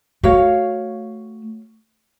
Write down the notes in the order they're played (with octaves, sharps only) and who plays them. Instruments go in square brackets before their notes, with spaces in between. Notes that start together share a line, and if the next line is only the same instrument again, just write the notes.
[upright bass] A3 [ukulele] F#4 C#5 F5